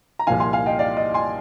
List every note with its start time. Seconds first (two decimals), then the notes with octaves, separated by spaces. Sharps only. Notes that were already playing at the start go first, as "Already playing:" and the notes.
0.19 A#5
0.27 C2 A#2 F3 F5 G#5
0.40 G#5 C6
0.53 F5 G#5
0.66 D#5 G5
0.79 D5 F5
0.97 D#5
1.14 G#5 C6